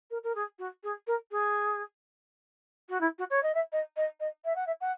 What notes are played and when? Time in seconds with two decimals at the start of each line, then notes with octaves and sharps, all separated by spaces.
0.11 A#4
0.23 A#4
0.35 G#4
0.59 F#4
0.84 G#4
1.07 A#4
1.31 G#4
2.89 F#4
3.01 E4
3.19 F#4
3.30 C#5
3.43 D#5
3.55 E5
3.72 D#5
3.97 D#5
4.20 D#5
4.45 E5
4.56 F#5
4.67 E5
4.81 F#5